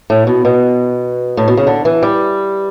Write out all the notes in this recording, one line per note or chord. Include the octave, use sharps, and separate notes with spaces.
A2
B2
B2
A2
B2
C#3
D3
E3
G3